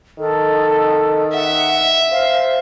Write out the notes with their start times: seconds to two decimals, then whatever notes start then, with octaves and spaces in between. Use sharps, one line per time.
0.19 D#3 A4
1.34 E5 F#5
2.12 C5 F5